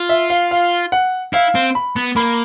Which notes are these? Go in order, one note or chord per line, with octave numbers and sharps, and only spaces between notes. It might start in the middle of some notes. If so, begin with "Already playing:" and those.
Already playing: F4
E5
F5
F5
F#5
E4 F5
C4
B5
B3
A#3 B5